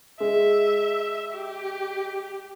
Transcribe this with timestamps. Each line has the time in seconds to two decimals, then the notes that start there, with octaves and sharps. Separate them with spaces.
0.20 G#3 E5
1.33 G4